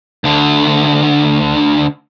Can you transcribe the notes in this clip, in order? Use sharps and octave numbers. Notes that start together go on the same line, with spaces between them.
D2 D3